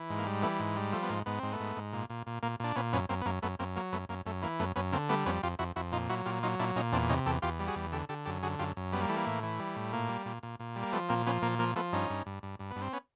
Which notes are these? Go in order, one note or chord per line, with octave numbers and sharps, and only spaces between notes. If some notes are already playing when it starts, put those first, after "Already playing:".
Already playing: E3
G#2
A#3
G3
E3 A3 B3
G#2
G3
F3 A3
B3
G#2 A#3
G#2 B3
G#2 C4
A3 B3
G#2
G#2
A#2
A#2
A#2
A#2 A#3
A#2 D4
A#2 B3 C#4
F#2 B3 C#4
F#2 A#3 C4
B3
F#2 A#3
F#2 A3 B3
F#2 A#3 C4
F#3 A#3
F#2 A3 B3
F#2 A#3
F#2 A3
E3 A#3
F#2 A3 B3
F#2 B3 C#4
D3 A#3 C4
G3 A3 B3
F2 B3 C#4
F2 F4 G4
F2 E4 F#4
F2 E4 F#4
A#2 D#4 F4
F#3 E4 F#4
A#2 F4 G4
F#3 D#4 F4
A#2 D4 E4
A#2 C#4 D#4
E2 C4 D4
C3 C#4 D#4
E2 G4 A4
E2 F4 G4
G3
F#4 G#4
E2
D3 G4 A4
D3 G4 A4
F#2 G4 A4
D3 F#4 G#4
F#2 F4 G4
F#2
G3 B3
A#3
E3 A3
A#3
A2
E3
G3
A2
A#2 A#3
G3
A#2
A#2
A#2
G3
A#3
F3 A3 B3
A#2 A#3 C4
F3 B3 C#4
A#2 A#3
F3 A#3
F3 A3 B3
G2 C#4 D#4
G2
G2
G2
G2
B3
G2
C4
B3 C#4